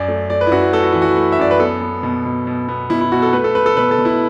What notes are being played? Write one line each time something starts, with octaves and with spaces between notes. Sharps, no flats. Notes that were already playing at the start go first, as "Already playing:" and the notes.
Already playing: F#2 D5
A3
A3 D5
B4
E4
F#2 F#4
A3 A4
F#4
E3 E4
F#4
A3
E5
F#2 D5
B4
B3 A4
B3
B2
B2
B2
B3
B2 E4
E4
B2 F#4
A4
A3 B4
A4
A3 B4
A4
B2 B4
A4
B2
E4